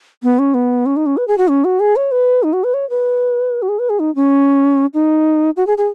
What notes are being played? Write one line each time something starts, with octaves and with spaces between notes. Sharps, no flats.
B3
C#4
B3
C#4
D#4
C#4
B4
G#4
F#4
C#4
F#4
G#4
C#5
B4
D#4
F#4
B4
C#5
B4
F#4
G#4
B4
G#4
D#4
C#4
D#4
F#4
G#4
G#4